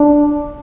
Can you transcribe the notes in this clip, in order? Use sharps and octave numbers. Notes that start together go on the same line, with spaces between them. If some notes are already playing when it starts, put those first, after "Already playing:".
Already playing: D4